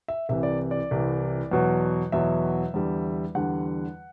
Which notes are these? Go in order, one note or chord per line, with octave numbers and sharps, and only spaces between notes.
E5
C2 C3 E3 E5
D5
D5
C2 C3 E3
E2 B2 F#3
E2 B2 F#3 E5
E2 D3 G3
E2 D3 G3 F#5